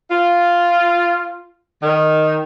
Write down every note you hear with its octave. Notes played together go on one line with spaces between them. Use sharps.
F4
D#3